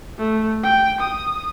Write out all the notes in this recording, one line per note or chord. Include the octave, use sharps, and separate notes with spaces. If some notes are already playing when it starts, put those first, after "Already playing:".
A3
G5
D#6